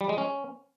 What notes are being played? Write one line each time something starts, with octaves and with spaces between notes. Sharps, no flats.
G3
G#3
C#4